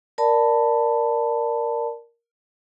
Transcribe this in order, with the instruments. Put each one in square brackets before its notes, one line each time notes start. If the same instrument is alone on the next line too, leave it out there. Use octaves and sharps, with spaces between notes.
[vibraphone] A#4 D5 A5 B5